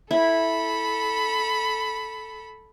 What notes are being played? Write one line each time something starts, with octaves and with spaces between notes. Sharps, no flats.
E4 A4 B5